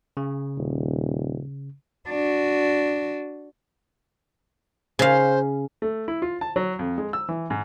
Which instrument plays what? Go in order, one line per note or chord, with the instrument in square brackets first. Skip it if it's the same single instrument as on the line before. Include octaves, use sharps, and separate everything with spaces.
[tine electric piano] C#3
[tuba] D#1
[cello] D4 F#4
[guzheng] C#3 F5 [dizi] C5
[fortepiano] A3
E4
F4
A5
F#3
F2
G#3
E6
E3
G#2